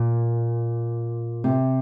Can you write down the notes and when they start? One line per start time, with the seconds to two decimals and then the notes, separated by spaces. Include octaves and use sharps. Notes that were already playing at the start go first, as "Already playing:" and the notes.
Already playing: A#2
1.44 C3